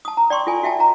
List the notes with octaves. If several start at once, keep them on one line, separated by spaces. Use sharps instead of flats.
A5 D#6
A#5
D5 G5 C6 C#6
F4 A4 G#5
F#4 E5 G5 A5
A#5